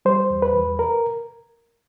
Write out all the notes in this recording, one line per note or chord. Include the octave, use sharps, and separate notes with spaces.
G3 C5
E2
B4
E2
A#4